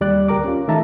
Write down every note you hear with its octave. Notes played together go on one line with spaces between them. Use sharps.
D#2 G3 D5 F#6
D2 G4 A#4 A#5 D6
C#4 F4
D#3 E3 A3 E5 A5 A#5